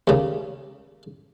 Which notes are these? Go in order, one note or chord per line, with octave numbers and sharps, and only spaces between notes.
D#2 C#3